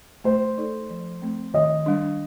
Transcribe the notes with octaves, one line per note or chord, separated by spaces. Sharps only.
A3 C5
D#4 A4 D5
F3
A3 C4
D#3 D#5
G3 D4